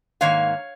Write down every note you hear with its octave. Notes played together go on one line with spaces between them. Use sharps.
G#2 D#3 A#3 C#5 F5